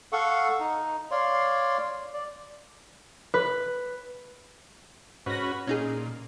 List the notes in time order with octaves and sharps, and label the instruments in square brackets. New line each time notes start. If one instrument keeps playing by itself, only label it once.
[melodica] A4 F5 F#5 C#6
D#4
C#5 D5 F5 C6
D5
[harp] B4
[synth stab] G#2 A#6 [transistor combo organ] C#4 F#4 B4
[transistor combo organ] A#2 [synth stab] C#4 D#4 G#4